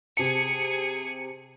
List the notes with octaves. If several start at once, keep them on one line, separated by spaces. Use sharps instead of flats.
C3 G#4 G#5 A5 C#7